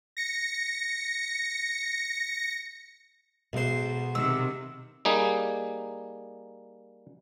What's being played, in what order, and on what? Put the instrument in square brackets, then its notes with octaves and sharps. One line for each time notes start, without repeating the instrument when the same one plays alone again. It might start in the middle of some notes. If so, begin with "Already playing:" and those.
[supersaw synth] A#6 C#7
[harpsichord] B1 C5 [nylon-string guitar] B2 G#3
[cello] C3 D#3 [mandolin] E6
[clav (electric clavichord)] G3 A#3 D#4 G#4